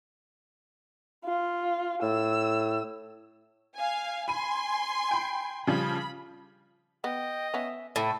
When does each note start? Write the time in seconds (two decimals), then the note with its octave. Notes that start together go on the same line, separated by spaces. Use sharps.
1.25 F4
2.02 A2 E6
3.76 F5 G#5
4.28 G#5 B5 C6 D#7
5.11 G5 B5
5.67 C#3 F3 G3 B5
7.04 B3 D#5 G5
7.54 B3 C#4 E5
7.96 A2 E4 E6